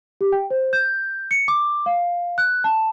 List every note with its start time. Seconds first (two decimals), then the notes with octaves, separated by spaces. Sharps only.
0.21 G4
0.32 G5
0.50 C5
0.73 G6
1.31 C#7
1.48 D6
1.86 F5
2.38 F#6
2.64 A5